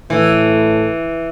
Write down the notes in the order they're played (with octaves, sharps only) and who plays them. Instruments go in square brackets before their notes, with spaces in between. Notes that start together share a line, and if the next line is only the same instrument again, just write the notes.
[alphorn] A2 [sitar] E3